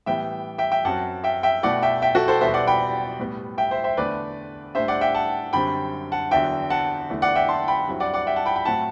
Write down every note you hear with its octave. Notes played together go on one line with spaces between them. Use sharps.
A2 E3 G3 B3 E4 E5 G5
E5 G5
E5 G5
F#2 F#3 C4 F#5 A5
E5 G5
E5 G5
B2 A3 E4 D5 F#5
E5 G5
E5 G5
F#4 A4
A4 C5
E2 B2 G3 B3 C5 E5
D5 F#5
G5 B5
A2 G3 B3
E5 G5
C5 E5
C5 E5
E2 D3 A3 B4 D5
A2 G3 D4 C5 E5
D5 F#5
E5 G5
F#5 A5
F#2 D3 G3 C4 G5 B5
F#5 A5
E2 D3 F#3 E5 G5
F#5 A5
E2 D3 A3 E4
D5 F#5
E5 G5
A5 C6
G5 B5
G2 F#3 C4 E4
D5 F#5
D5 F#5
E5 G5
F#5 A5
G5 B5
G5 B5
A2 F#3 C4 E4 F#5 A5